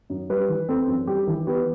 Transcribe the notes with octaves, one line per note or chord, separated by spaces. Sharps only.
F#2
G3 B4
E3
C4 A4
F#2
G3 G4
E3
B3 G4